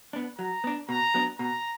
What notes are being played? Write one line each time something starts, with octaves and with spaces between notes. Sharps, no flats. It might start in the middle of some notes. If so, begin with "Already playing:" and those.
B3 D4
F#3 A#5
B3 D4
B2 A#5
F#3 B3 D4
B2 A#5